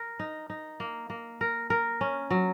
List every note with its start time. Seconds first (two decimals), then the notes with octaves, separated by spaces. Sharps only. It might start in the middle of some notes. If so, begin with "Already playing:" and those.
Already playing: A#4
0.20 D#4
0.50 D#4
0.80 A#3
1.10 A#3
1.41 A#4
1.70 A#4
2.01 C#4
2.31 F#3